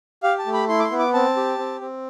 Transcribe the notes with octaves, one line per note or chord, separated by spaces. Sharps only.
G4 F5
A5
A3
B5
E4 C6
D6
C6
B3
D6
C4 A5
G4
C4
C4